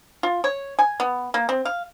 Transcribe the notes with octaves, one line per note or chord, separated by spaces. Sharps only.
F4
C#5
G#5
B3
A#3
C4
F5